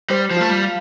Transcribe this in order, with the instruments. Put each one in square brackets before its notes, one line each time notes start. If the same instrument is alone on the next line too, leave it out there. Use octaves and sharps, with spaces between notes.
[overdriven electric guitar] G3 [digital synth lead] C5
[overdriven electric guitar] F3
[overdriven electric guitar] A3 [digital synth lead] F4
[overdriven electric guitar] G3
[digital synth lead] F5